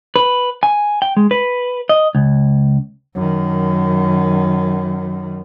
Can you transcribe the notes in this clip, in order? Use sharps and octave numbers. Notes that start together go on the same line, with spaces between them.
B4
G#5
G5
G#3
B4
D#5
C#2
F#2 D#3